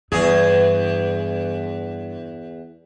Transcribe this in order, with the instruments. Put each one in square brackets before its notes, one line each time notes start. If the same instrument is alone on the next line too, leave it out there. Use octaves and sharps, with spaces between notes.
[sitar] E2 G#4 [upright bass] G2